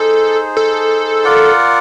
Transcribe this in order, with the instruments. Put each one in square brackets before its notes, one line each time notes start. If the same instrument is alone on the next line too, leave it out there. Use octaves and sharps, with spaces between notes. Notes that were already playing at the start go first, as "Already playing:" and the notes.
Already playing: [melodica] D#4 G#4 C5 [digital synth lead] A4
[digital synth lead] A4
[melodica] F4 A#4 D5 F#5